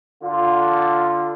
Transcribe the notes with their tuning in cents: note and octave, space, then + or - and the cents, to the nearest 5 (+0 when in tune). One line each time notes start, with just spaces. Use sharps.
D3 +0 F4 +0